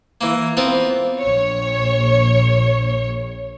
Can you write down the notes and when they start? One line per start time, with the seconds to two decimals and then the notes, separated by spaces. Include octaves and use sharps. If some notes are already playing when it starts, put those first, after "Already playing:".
0.21 E3 A#3
0.57 B3 C4 F4 A#4
1.20 A#1 C#5